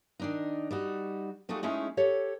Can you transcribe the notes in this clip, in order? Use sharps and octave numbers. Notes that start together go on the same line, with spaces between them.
D#3 D4 D#4
G3 D#4 F#4
G3 A3 D#4 F4 F#4 G#4
G#3 A3 C#4 D#4 E4 G#4
G4 A4 C#5